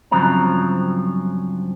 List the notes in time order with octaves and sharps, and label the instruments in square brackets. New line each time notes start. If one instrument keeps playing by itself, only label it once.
[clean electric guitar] G2 C#3 F3 F#3 C4 A#5